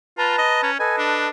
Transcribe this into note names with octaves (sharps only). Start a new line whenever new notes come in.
F4 B4 A5 A#5
D#5
C#4
A4 B4 D#5 G#5
D4